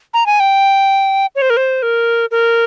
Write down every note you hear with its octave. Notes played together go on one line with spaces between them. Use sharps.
A#5
G#5
G5
C#5
C5
A#4
C5
A#4
A#4